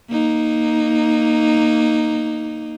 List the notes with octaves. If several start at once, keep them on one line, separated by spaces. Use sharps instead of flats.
A#3 D#4